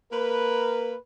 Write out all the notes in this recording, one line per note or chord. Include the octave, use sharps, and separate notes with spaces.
A#3 A#4 B4